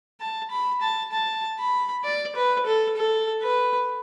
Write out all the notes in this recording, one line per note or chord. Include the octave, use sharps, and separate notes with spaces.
A5
B5
A5
A5
B5
D5
B4
A4
A4
B4